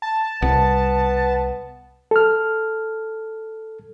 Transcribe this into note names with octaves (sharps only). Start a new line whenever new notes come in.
A5
C2 B3
A4 F6